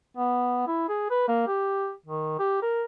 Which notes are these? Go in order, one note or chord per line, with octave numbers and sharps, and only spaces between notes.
B3
E4
G#4
B4
A#3
G4
D#3
G4
A#4